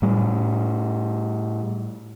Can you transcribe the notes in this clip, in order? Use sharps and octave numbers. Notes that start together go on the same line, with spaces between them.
A2 G3